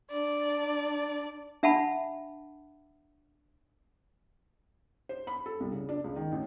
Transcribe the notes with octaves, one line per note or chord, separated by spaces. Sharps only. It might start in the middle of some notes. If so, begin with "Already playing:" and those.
D4 D5
D4 E5 F#5 A5 B5
C5
B5
A4
C2
C#3
D4
C#2
D#3
A1